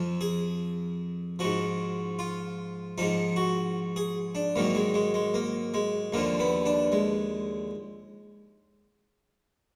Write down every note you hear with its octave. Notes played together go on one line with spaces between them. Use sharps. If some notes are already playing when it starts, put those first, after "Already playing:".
Already playing: F2 F3
G#4
G#2 F3 F#4
F4
G#2 F3 D#4
F#4
G#4
D4
G#2 D#3 F#3 A#3
G#3
G#3
G#3
A#3
G#3
D#2 D3 F3 A#3
B3
D4
G#3